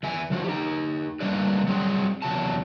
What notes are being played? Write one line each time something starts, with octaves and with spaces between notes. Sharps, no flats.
E2 E5 G#5
E3 F3 F#4
D#4 G4
A2 G3 A#3 D4 B4 D5
F#3 G3 C4 F#4 G#4
E2 C3 F#3 A5